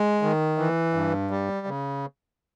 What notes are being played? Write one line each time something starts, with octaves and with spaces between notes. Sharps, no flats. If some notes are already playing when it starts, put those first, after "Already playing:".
Already playing: G#3
D#3
E3
G2
G3
C#3